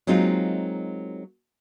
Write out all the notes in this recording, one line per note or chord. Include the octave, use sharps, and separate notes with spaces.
F#3 G#3 A#3 C4 D#4 F4